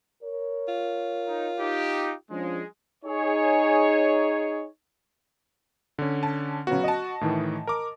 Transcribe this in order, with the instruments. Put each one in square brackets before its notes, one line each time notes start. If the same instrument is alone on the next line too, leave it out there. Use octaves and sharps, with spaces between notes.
[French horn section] A#4 C#5
[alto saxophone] F4
[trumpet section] D#4
D#4 G4
[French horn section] F3 C#4 D4 [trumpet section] G#3
[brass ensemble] D#4 G#4 C#5
[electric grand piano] D3 C#4
[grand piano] A5
[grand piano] C#3 F#3 B3 [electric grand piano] F#4
[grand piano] D#5 A5
[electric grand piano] A2 D#3 E3
A#4 D6